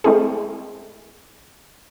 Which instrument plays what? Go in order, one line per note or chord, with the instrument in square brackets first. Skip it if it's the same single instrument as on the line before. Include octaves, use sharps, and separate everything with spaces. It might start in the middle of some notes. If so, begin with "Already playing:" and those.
[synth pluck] G#3 A3 C4 E4 G#4